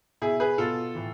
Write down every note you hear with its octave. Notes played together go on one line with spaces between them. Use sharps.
B2 E4 G#4
G#4 B4
B2 F4 A4
A2 E3